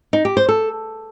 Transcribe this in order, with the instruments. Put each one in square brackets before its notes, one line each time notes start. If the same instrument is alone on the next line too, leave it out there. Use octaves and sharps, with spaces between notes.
[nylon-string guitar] D#4
G4
C5
A4